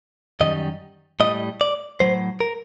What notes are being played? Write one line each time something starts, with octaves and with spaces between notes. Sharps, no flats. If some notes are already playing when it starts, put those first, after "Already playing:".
F#2 D#3 G3 D#5
A2 G3 D#5
D5
A2 F#3 C5
A#4